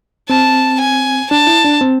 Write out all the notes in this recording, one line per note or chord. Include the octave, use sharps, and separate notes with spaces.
C4 A5
G#5
D4 A5
E4
D4
C4